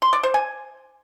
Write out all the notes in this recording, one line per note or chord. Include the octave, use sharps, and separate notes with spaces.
C6
D5
C5
G#5